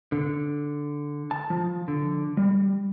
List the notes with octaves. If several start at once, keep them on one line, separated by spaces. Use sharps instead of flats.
D3
A5
F3
D3
G3